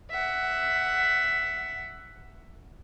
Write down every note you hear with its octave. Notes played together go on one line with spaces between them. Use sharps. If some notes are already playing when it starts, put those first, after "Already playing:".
E5 F#5